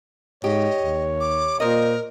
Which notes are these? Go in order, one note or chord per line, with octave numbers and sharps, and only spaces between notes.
G#2 G4 C#5 D#5
D#2
D6
A#2 A#4 C5 D#5